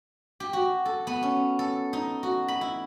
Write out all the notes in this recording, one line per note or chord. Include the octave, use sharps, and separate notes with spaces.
G4
F#4
A4
B3
C#4
A4
D#4
F#4
B5
E4